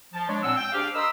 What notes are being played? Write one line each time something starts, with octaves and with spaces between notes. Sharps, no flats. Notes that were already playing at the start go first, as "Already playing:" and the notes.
F3 A5
G#3 D4 C#5 D5
A#2 C4 F#5 G#5 E6
G5
D4 G4 G#4 C5 F5
A#4 D#5 B5 C6 E6